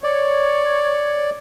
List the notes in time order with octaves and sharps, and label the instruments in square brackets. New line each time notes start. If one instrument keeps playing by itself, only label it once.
[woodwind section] C#5 [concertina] D5